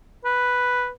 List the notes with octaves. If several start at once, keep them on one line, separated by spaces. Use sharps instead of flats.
B4